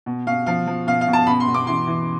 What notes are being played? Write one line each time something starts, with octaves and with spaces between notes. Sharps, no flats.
B2
B2 F5
F3 F5
F3
B2 F5
F5
B2
A5
B2 B5
C6
B2
D6
E3 C6
E3